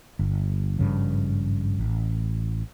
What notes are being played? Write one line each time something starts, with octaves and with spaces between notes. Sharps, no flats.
G1
G#1 G2 C#3 F3
A1